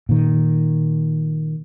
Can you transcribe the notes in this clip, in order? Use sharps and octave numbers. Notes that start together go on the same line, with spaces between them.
A#2 D#3